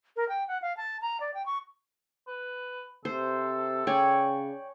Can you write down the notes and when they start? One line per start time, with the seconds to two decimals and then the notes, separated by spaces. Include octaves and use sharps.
0.16 A#4
0.29 G5
0.48 F#5
0.62 F5
0.77 A5
1.02 A#5
1.20 D5
1.34 G5
1.46 C#6
2.27 B4
3.05 C3 A4 C5
3.87 C#3 C#5 D5 G5 G#5